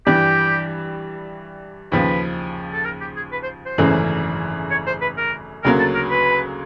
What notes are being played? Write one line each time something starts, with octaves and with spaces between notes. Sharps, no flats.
G2 E3 G3 G4
D#2 C#3 F3 B4
A4
A#4
G4
G#4
B4
C5
C5
G#1 F#2 C#3 E3 A3
C#5
C5
B4
A#4
D2 C#3 F#3 A#3 A#4
A4
A#4
B4